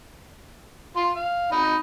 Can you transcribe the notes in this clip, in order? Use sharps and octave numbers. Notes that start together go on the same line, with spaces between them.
F4 C6
F5
D#4 D#5 B5